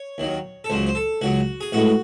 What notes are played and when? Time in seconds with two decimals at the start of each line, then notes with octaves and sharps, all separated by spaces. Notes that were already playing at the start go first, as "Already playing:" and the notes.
Already playing: C#5
0.18 D#2 D#3 F#3
0.64 A4
0.70 C#2 C#3 F#3 C5
0.87 C5
0.95 A4
1.21 C#2 C#3 F#3 F#4
1.61 G#4
1.72 A1 A2 G#3 F#4